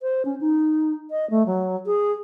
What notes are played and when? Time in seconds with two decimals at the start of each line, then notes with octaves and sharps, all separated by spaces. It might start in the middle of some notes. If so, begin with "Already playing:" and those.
0.02 C5
0.25 C#4
0.41 D#4
1.11 D#5
1.30 A3
1.46 F#3
1.86 G#4